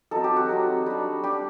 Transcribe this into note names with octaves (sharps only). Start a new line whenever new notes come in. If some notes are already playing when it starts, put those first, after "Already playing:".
F#3 C4 D#4 A4
G4
F#4
F#3 C4 D#4
G3 D4
G3 D4 G4